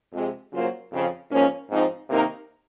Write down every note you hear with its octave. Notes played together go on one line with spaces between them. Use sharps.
F2 C3 F3 G#3
C#3 F#3 A#3 F4 C5
F2 C#3 F3
G#2 F3 A#3 C#4
G#2 F3 C4 D#4
C3 D#3 A#3 D#4 A#4